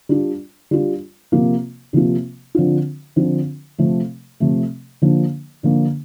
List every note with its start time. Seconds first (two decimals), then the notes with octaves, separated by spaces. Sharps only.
0.09 G3 D4 F4
0.71 G3 D4 F4
1.32 C3 F3 A#3 F4
1.93 C3 F3 A#3 F4
2.55 D3 F3 C4 F4
3.16 D3 F3 C4 F4
3.78 C3 F3 A3
4.40 C3 F3 A3
5.02 D3 F3 A#3
5.63 D3 F3 A#3